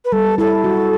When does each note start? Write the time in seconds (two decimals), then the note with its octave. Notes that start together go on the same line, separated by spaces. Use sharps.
0.05 B4
0.12 G3 A4
0.38 E4 A4
0.64 F#4